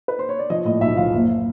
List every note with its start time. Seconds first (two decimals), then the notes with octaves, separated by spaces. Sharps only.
0.08 B4
0.19 C5
0.29 C#5
0.39 D5
0.50 F3 D#5
0.65 A2 D#5
0.81 B1 E5
0.97 F3 F5
1.13 F#1